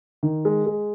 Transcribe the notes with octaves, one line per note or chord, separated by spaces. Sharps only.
D#3
G#3
G#3